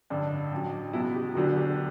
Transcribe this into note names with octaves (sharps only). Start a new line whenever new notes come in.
A1 G2 D3 D4
A1 G2 F#3
C#2 B2 F#3 E4
G4
E1 D2 D3 F#3 F#4
G4